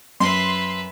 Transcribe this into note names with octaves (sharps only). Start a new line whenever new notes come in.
F#2 B4 E5 C6